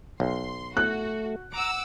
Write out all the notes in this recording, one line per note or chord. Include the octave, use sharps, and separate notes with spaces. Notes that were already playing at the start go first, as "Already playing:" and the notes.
B1 C6
A3 F#4 F#6
F#5 A#5 D6 E6